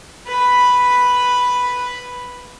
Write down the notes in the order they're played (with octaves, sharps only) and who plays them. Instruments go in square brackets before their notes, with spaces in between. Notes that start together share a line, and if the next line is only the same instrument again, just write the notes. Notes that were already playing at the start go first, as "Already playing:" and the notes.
[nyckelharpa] B4 B5